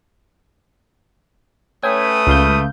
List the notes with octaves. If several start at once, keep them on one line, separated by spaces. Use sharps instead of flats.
A3 C#4 B4 G5 G#5 D#6
C#2 F5 G6